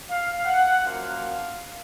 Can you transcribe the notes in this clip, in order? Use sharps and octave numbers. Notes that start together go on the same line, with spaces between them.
F5
F#5
F#2 F3 A#3 F5